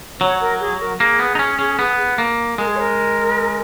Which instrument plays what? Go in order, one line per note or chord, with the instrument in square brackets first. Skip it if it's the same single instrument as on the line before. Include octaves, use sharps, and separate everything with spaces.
[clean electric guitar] F#3 [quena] C#5
[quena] A#4
G#4
A#4
[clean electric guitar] A#3 [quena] G#4
[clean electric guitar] B3
D#4
C#4
C#4
B3
A#3
[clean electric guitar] G#3 [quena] A#4
[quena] G#4
C#5
A#4